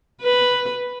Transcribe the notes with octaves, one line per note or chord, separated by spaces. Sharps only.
B4